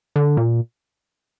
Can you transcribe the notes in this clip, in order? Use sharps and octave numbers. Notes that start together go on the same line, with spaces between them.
D3
A#2